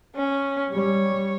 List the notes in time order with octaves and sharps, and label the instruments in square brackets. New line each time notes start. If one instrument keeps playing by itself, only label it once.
[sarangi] C#4
[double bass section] G3 [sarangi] C#5